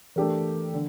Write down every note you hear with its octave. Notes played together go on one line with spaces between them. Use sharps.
E3 A3 D4 G4 A#4
D3